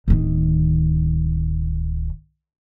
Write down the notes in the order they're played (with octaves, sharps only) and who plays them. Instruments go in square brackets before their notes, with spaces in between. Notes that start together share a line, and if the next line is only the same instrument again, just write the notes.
[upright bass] D1 D#3